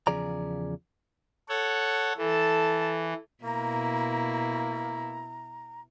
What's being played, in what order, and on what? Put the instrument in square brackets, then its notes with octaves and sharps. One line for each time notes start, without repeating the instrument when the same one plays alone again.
[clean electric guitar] E2 C#3 F3 G#4 D5 A#5
[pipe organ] A4 C#5 F#5
[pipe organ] E3 [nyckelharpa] A4 A5
[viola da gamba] B2 E4 [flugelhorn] A#3 [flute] A#5